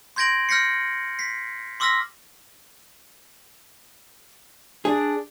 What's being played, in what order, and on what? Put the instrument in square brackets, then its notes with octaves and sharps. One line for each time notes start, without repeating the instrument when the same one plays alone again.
[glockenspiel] C6 G6 G#6 A#6 D7 F#7
F6 G6 A#6 C7 C#7
B6 C7
C6 D6 E6 F6 A#6 B6
[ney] D4 [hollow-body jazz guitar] G#4